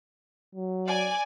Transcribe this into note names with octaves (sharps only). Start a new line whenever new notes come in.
F#3
D5 G#5